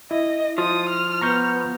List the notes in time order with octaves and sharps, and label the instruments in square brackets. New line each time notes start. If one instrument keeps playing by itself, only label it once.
[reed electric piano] E4 [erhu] D#5
[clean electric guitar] F3 [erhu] D#6
[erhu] F6
[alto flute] B3 [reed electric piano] A#5 C#6 G6